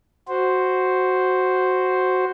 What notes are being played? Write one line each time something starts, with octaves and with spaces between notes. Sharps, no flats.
F#4 C5